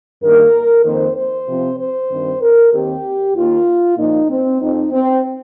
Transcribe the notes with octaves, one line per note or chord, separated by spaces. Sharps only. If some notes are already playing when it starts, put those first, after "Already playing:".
G2 D#3 A#3 A#4
F2 D#3 A#3 C5
C5
C3 F3 C4
C5
G2 D#3 C4
A#4
D#2 D#3 C4 G4
D#2 D#3 A#3 F4
A#2 F3 A#3 D#4
C4
F2 F3 C4 D#4
C4